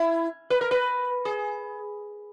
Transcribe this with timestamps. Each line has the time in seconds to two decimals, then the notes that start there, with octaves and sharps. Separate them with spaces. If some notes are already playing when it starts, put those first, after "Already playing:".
Already playing: E4
0.50 B4
0.61 A#4
0.71 B4
1.25 G#4